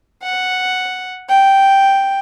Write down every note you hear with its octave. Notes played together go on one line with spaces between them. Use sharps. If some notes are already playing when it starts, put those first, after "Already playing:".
F#5
G5